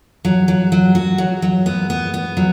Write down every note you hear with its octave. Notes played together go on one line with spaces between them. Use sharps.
F#3
F#3
F#3
F#4
F#3
F#3
B3
B3
B3
F#3